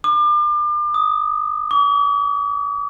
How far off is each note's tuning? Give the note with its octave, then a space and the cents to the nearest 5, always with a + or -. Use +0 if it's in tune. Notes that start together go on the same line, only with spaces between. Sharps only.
D6 +35
D#6 +5
D6 -45